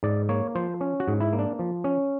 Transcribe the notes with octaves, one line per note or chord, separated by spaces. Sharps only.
G#2 D5
A#3 C#5
F3 C5
C#4
F#4
G#2
E4
A#3
D4
F3
C#4